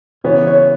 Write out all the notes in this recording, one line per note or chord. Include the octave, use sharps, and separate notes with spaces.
C#3 E3 B3 C#5
C#5